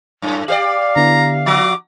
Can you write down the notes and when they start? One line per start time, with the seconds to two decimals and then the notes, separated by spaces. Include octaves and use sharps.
0.22 F#2 A2
0.48 G4 B4 D5 F5
0.96 D3 B3 E4 A#5
1.46 F3 F#4 D6